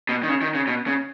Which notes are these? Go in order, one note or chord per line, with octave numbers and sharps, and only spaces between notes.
B2
D#3
C#3
D#3
C#3
B2
C#3